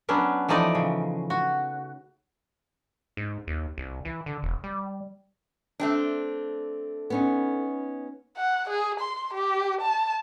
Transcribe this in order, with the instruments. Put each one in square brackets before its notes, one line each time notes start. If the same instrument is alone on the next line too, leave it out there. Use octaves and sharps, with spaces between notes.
[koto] F#3 B3 C#4 D4
E3 F3 A3 D#4 D5 D#5
C#3
F#4
[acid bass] G#2
D#2
C2
E3
D3
E1
G3
[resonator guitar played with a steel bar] A3 C4 D4
[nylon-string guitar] B3 C#4 D#4
[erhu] F#5
G#4
C6
G4
A5